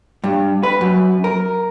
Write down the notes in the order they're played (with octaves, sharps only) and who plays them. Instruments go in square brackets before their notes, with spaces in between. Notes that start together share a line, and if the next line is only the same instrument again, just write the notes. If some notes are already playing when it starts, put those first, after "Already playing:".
[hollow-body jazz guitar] G2
B4
F#2
A#4